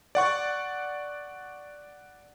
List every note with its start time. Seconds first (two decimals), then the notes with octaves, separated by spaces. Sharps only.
0.15 D5 F#5 C#6